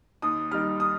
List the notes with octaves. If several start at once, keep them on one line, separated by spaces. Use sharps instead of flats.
D#2 D#6
D#3 G3 F6
D#6